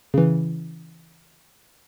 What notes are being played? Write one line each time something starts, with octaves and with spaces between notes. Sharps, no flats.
C#3 E3